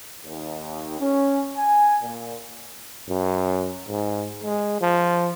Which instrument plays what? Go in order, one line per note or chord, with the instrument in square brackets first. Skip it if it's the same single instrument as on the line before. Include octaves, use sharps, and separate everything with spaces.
[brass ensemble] D#2
C#4
G#5
A#2
[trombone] F#2
G#2
G#3
F3